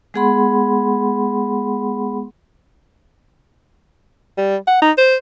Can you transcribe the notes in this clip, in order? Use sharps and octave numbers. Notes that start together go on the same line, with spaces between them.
G#3 B3 G#4 F#5 B5 C6
G3
F#5
D#4
C5